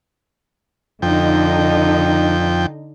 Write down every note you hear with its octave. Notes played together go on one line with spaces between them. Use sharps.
F2 D3 D#4 G5